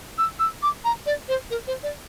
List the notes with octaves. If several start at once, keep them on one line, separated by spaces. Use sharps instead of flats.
E6
E6
D6
A#5
D5
C5
A#4
C5
D5